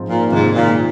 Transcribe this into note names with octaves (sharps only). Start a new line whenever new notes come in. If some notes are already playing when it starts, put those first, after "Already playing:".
Already playing: G#2 F3 C4 F4
A#2
G#2 C3 D#3 A#3
A#2